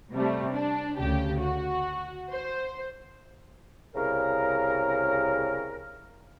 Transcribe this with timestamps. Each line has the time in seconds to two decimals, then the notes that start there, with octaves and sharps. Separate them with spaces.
0.12 C3 G3 A3
0.53 D4
0.99 D2 C#3 G4
1.41 F#4
2.32 C5
3.95 C2 C#3 A#4